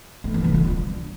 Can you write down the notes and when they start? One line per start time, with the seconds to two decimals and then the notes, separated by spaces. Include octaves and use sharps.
0.24 A3
0.34 E3
0.44 D3
0.54 F4
0.64 D4